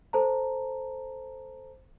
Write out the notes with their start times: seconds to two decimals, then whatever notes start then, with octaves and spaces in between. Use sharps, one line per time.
0.13 A4 C5 A5 A#5